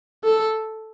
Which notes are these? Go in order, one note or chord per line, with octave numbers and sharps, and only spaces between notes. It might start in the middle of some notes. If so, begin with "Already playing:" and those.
A4